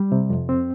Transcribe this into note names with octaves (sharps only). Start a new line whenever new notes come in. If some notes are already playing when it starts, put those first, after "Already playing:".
Already playing: G3
C3
F2
C4